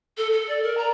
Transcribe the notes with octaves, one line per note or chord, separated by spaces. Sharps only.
A4
A4
D5
A#4
A#5